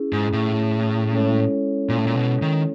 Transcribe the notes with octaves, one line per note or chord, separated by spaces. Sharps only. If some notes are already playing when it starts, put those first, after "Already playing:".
Already playing: C#4 E4 G#4
G#2
A2
G#3 C#4 E4 A4 C#5
A#2
A2
A#2
B2
D#3